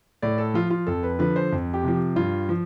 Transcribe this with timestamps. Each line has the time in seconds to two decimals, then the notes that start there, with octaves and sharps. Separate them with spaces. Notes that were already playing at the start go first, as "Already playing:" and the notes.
0.22 A2 D5
0.38 A4
0.54 F3 F4
0.70 F4
0.87 F2 A4
1.03 B4
1.19 D3 F3 B4
1.36 C5
1.52 F2
1.74 G4
1.83 C3 F3
2.16 G2 F4
2.49 F3